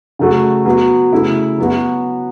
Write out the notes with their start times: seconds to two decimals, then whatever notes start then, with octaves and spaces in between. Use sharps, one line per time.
0.19 C#3 F#3 A3 F#4
0.65 F#3 B3 F#4
1.13 C#3 A3 E4
1.58 F#3 B3 F#4